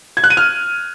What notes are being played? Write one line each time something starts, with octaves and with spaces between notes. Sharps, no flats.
G#6
F#6
D#7
F6